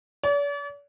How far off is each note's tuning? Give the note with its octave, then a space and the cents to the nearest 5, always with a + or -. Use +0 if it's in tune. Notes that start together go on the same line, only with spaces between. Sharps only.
D5 -45